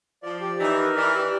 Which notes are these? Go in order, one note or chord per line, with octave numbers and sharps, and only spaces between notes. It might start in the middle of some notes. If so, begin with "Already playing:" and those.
F3 D5
G4
E3 D#4
A#4
E3 D5
G4